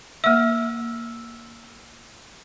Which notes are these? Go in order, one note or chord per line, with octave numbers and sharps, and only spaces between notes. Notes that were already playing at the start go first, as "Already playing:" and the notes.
A#3 E5 E6 F6